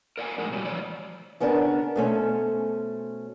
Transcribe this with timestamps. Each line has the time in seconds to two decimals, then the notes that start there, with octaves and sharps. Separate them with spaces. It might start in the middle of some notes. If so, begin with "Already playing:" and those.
0.18 A#4 D5 F#5 G#5
0.38 F2 A2 G#3 G#5
0.51 B2 F#3 G3
0.64 E3 F3 C#5 D5
1.40 C#3 B3 C#4 D4 A#4
1.96 B2 A3 C#4 C5